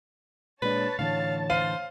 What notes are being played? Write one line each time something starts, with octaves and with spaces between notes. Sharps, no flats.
A#2 G#3 D4 B4 C#5 A5 A6
A2 D3 E3 F5
C5 F5 D#7